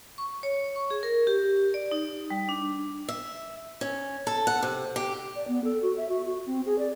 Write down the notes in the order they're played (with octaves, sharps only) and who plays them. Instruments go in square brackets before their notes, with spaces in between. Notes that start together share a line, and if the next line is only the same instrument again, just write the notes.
[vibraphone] C#6
C#5
C#6
G#4
A#4
G4
D5
D#4
G3
D4
[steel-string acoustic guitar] E5
C#4
A4
F#5
C3
G4
[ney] D5
B3
A4
F#4
E5
F#4
F#4
C4
G#4
D5